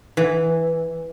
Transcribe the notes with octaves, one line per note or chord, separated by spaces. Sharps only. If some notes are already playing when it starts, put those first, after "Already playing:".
E3